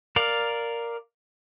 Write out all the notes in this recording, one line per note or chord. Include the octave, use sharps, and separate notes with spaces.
A#4 D5 F5